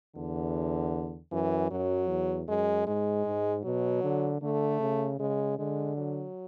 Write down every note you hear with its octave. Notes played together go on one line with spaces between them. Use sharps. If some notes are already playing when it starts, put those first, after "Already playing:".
E2 D3
F#2 E3
F#2 F#3
E2
F#2 G#3
G#2 G#3
G#2
B2 F#3
D3
D3 A3
C#3
C#3 G#3
D3 G#3
F#3